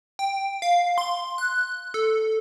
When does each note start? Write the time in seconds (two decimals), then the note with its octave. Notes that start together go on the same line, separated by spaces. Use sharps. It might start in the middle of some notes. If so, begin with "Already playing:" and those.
0.19 G5
0.62 F5
0.98 C6
1.38 F#6
1.94 A4